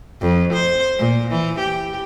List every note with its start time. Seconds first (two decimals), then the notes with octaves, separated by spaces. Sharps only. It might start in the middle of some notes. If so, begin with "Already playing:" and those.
0.22 F2
0.53 C5
0.99 A#2
1.31 E3
1.59 G4